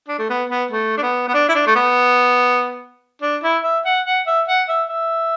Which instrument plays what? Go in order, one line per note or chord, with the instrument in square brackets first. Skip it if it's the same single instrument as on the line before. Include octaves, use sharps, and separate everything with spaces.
[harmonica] D4
A3
B3
B3
A3
D4
B3
B3
D4
E4
D4
A3
B3
D4
E4
E5
F#5
F#5
E5
F#5
E5
E5